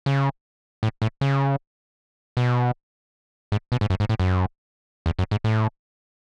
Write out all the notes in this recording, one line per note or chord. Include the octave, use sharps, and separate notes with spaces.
C#3
A2
A2
C#3
B2
G#2
B2
G#2
F#2
G#2
A2
F#2
E2
F#2
G#2
A2